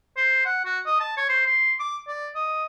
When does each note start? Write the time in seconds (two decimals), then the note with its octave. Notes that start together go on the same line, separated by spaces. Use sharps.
0.17 C5
0.45 F#5
0.65 F#4
0.86 D#5
1.00 A5
1.17 C#5
1.29 C5
1.46 C6
1.79 D6
2.07 D5
2.35 D#5